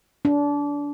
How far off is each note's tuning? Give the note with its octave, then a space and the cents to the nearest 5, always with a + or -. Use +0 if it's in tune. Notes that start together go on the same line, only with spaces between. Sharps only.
D4 -25